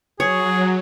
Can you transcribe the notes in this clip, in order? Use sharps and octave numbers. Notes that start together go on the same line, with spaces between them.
F#3 G#4 C#5